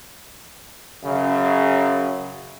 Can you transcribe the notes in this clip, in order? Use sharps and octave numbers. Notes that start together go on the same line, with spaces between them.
F#2 C#3